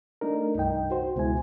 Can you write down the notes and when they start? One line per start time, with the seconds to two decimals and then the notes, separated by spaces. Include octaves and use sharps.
0.21 A3 D4 D#4 A#4
0.55 C2 G2 D#4 G5
0.91 F#4 C5
1.16 C#2 B2 G#3 E4 G#5